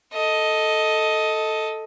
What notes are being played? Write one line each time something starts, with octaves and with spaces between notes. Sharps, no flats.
A4 D#5